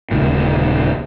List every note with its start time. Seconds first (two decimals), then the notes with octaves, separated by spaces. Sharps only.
0.11 D#1 C#2 A#2